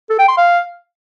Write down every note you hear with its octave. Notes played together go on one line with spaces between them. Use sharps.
A4
G5
C6
F5